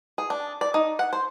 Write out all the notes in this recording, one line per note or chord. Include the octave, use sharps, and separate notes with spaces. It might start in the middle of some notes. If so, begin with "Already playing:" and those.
G#4
D4
D5
D#4
F#5
C5